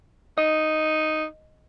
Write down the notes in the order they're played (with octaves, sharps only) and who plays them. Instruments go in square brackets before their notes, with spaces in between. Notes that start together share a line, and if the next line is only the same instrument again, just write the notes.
[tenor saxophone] D#4 [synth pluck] D#5